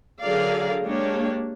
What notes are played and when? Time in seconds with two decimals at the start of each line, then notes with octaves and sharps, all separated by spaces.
0.21 D3 F#3 G#4 A#4 D5 F5
0.86 G#3 A#3 D4 G4 C#5